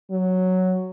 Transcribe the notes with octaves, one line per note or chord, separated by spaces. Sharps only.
F#3